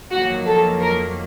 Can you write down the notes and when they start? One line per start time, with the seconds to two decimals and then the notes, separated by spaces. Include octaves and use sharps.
0.12 F2 D#3 F#3 A#3 F#4
0.46 A4
0.80 A#4